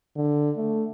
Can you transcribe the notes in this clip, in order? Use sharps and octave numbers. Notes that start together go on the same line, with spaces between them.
D3
A3